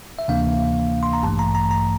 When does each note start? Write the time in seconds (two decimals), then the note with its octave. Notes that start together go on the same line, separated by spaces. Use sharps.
0.19 E5
0.28 D2 C3 E3 A#3 D4 F5
1.03 C6
1.13 A#5
1.23 A1 G2 E3 A3 A5
1.39 A#5
1.55 A#5
1.71 A#5